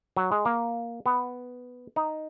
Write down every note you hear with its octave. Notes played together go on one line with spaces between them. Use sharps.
F#3
G#3
A#3
B3
D#4